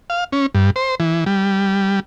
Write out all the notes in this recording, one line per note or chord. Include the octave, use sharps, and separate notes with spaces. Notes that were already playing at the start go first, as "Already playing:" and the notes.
F5
C#4
G2
C5
E3
G3